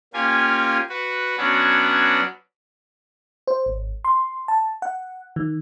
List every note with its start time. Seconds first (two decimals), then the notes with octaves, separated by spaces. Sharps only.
0.14 A#3 C#4 F4 G4 G#5
0.89 F#4 B4
1.37 F#3 B3 C#4 D4 F#4
3.47 C5
3.66 G#1
4.05 C6
4.48 A5
4.82 F#5
5.36 D#3